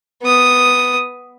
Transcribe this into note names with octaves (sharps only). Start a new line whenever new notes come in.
B3 D#6